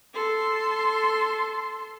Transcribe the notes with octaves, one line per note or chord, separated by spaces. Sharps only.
A4 C6